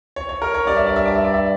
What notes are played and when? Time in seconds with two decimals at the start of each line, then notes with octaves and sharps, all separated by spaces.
0.16 C#5
0.29 C#5
0.42 A#4
0.54 C#5
0.67 G2 D5
0.76 E5
0.87 D5
0.96 E5
1.06 D5
1.15 E5
1.24 D5
1.34 E5